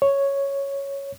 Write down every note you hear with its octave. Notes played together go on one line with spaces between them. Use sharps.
C#5